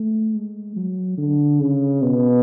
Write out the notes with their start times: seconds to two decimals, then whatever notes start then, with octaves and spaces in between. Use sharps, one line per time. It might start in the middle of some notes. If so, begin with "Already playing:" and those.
Already playing: A3
0.34 G#3
0.76 F#3
1.18 D3
1.60 C#3
2.02 B2